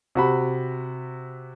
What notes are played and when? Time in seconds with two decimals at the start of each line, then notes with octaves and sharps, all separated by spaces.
0.15 C3 F#4 B5